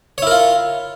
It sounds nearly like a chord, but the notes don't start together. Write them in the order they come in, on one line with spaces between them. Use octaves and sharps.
C#5 E4 A#4 F4